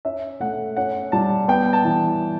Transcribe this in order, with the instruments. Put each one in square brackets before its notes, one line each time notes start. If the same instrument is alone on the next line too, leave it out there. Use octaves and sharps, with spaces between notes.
[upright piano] C#4 [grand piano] E5
[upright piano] A3 [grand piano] F#5
[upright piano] C#4 [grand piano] F#5
[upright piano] G3 [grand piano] A5
[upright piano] B3 [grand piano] G5
[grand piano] A5
[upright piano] E3